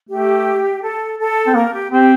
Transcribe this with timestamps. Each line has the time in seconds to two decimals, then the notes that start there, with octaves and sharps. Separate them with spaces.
0.09 A3 G4
0.82 A4
1.18 A4
1.47 C4
1.55 A#3 A#4
1.73 G4
1.91 C4 G4